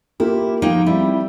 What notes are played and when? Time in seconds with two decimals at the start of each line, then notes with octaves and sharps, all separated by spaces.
0.20 A#3 E4 F4 G4
0.62 F3 A#3 D#4 G5
0.87 G3 C4 E4